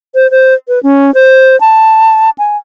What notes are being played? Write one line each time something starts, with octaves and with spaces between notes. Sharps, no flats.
C5
C5
B4
C#4
C5
A5
G#5